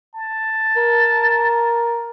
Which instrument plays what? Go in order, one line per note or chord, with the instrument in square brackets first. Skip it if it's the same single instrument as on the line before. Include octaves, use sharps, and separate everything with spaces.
[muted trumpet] A5
[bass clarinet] A#4